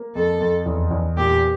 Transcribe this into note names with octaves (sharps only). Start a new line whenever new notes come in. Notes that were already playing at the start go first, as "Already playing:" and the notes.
Already playing: A#3
F2 A4
F2
E2
E2
A#2 G4